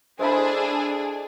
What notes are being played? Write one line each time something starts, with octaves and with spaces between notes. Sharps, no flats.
G#3 D4 E4 G#4 A4 C5 E5 B5